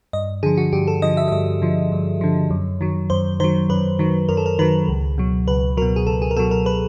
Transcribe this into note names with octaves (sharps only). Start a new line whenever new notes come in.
G2 D#5
D3 F3 G#4
F#4
G2 G4
A4
D3 F3 D#5
E5
E5
G2 D#5
D3 F3
G2
D3 F3
F#2
D#3 F#3
F#2 C5
D#3 F#3 C5
F#2 B4
D#3 F#3
F#2 A#4
A4
A#4
D#3 F#3 B4
C#2
B2 F#3
C#2 B4
B2 F#3 A#4
G#4
C#2 A4
G#4
A#4
B2 F#3 A4
A#4
B4